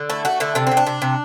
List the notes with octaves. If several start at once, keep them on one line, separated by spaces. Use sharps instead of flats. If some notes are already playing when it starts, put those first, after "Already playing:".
Already playing: D3
A3 E4
A3 F#4
D3 E4
C3 D4
C3 C4
D4
C3
C3